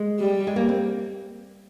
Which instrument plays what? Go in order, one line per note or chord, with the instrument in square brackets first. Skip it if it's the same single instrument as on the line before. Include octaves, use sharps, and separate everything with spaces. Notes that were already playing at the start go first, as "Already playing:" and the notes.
Already playing: [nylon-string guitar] G#3
[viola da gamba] G3
[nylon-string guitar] G#3
A#3
C4